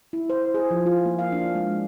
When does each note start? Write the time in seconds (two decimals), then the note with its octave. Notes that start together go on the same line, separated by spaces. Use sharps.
0.13 E4
0.30 C5
0.54 G#4
0.71 F3
0.86 F4
1.05 A#3
1.19 F5
1.32 D4
1.55 G#3